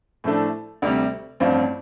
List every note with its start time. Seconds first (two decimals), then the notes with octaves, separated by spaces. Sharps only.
0.24 A2 F3 A3 D4 A4
0.82 D2 C3 G3
1.40 A1 G2 F3 C4 F4